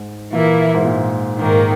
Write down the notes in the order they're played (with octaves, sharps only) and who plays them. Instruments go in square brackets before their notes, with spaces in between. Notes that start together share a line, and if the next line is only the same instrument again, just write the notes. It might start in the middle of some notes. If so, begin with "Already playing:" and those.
Already playing: [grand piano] G#2
[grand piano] A#2 [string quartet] E3 A#3 E4
[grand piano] G#2
A#2
[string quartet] G#2 D#3 A#3